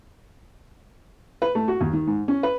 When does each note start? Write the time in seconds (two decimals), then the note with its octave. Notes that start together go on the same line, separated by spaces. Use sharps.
1.42 B4
1.55 A3
1.68 F#4
1.81 D#2
1.93 D#3
2.07 G#2
2.28 C#4
2.43 B4